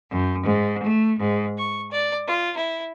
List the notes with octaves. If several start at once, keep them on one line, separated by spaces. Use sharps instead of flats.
F#2
G#2
A3
G#2
C#6
D5
F4
E4